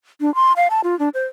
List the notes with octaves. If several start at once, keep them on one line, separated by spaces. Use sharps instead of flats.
D4
C6
F5
A5
F4
D4
C5